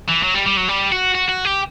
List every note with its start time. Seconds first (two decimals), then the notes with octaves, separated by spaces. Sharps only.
0.09 E3
0.23 F#3
0.34 G3
0.46 G3
0.57 F#3
0.68 G3
0.92 F#4
1.15 F#4
1.29 F#4
1.45 G4